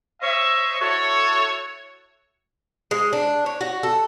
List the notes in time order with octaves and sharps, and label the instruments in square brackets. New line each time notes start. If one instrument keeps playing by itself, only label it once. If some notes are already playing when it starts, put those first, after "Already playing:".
[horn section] C5 C#5 D#5 E5
E4 F#4 A4 C#5
[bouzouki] G#3
D4
C#5
F#4
A4